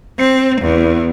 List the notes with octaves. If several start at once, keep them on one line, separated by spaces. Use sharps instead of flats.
C4
E2